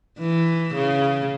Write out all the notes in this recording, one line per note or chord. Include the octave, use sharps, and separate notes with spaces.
E3
C#3